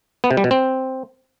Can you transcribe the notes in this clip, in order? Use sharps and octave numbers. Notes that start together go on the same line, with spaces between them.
B3
C3
G3
B2
C4